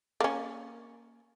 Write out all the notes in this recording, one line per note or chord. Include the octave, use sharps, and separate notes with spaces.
A#3 C#4